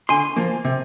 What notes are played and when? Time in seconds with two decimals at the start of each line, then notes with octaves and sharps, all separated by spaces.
0.09 D3 G#5 C6
0.36 F3 A#3
0.65 C3